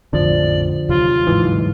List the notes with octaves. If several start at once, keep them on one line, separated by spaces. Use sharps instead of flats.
A#1 F2 A2 D3 F3 D5
D#2 C3 F#3 F4
G1 G#2 E3